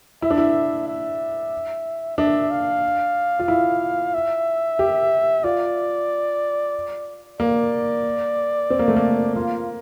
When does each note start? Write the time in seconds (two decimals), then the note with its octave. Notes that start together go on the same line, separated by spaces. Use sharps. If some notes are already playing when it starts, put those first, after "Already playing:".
0.22 E4 E5
0.30 D4
0.38 E4
0.88 E5
2.18 D4 E5
2.51 F5
3.39 F4
3.48 E4
4.14 E5
4.79 G4
5.44 F4 D5
7.40 A#3 D5
8.70 C4
8.79 A#3
8.88 A3
8.96 A#3
9.35 A#3 F4